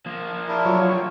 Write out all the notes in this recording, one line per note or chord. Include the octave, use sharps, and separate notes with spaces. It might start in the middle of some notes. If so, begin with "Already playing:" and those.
F3 A#3
D4 E4 A#4
F#3 F4 C#5
G5